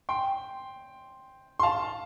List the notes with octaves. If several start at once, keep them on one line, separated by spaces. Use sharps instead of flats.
G5 C6
C6
F5 A5